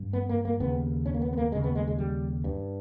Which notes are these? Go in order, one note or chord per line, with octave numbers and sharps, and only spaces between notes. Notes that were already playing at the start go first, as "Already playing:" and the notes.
Already playing: G2
B3
A#3
A#3
D#2 C#3 B3
C#4
A#3
B3
B3
A#3
D#2 C#3 G#3
B3
G#3
G#3
G3
G2